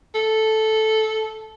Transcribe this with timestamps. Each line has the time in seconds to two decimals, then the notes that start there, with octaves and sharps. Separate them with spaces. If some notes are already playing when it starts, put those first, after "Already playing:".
0.15 A4